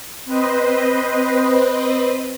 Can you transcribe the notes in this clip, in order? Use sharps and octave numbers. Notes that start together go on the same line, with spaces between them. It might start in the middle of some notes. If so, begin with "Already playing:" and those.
C4 B4 C5 D#5